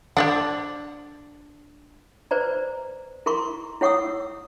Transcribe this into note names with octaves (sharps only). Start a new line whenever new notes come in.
D4 C5 D5 F#5
B4 C5 D5 A#5
E4 A#4 A#5 C6 C#6
E4 C#5 F#5 C#6 D#6 E6